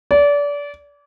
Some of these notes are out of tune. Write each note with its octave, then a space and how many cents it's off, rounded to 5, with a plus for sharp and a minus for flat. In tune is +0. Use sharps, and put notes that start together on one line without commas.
D5 -30